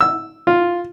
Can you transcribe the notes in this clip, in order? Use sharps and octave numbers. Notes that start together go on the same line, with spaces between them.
E6
F4